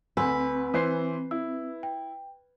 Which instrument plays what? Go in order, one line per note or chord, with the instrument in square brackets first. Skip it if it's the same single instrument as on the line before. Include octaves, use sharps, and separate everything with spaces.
[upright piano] D2 [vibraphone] C4 [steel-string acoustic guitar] B4 [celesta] G#5 C6 E6
[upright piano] E3 C5 C7
[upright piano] E4 [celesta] E6
[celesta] G5